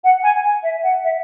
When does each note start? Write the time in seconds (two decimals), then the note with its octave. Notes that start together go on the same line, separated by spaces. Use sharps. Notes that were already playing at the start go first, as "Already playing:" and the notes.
0.04 F#5
0.23 G#5
0.63 E5
0.83 F#5
1.04 E5